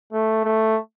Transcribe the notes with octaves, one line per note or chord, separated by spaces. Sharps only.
A3
A3